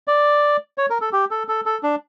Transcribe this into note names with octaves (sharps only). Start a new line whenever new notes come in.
D5
C#5
A#4
A4
G4
A4
A4
A4
D4